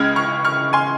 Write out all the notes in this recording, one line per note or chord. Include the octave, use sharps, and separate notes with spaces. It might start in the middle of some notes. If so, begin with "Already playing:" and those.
Already playing: C#2 C#3 G#3 F6 G#6
C#6 F6
C#6 F6
G#5 C6